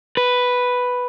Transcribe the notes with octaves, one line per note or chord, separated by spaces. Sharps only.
B4